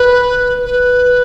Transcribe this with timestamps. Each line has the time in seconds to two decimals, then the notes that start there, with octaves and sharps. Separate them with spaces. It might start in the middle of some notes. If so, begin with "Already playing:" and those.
Already playing: B4
0.65 B4